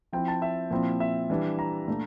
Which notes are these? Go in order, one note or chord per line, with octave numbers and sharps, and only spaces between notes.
F3 C4 E4 G5
A5
E5
A#2 F3 C4 E4
E5
E3 G3 D4
A#5
A#2 A3 D4